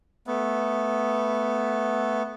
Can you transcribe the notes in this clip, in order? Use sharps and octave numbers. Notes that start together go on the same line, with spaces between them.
A3 B3